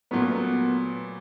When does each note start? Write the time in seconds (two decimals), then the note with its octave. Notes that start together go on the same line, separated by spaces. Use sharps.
0.11 A#2 F#3 A3 B3
0.21 A#3
0.30 B3